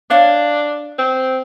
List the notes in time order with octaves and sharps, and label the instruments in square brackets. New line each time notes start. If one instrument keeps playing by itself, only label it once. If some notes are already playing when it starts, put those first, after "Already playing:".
[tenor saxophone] D4 [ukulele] C#5 D5 F5
[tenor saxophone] C4